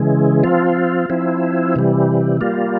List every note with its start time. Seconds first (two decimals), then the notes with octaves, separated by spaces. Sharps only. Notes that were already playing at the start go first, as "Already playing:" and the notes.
Already playing: C#3 E3 G#3
0.44 F3 C4 F4
1.10 F3 C4 E4
1.76 C3 E3 G3
2.41 G3 A#3 F4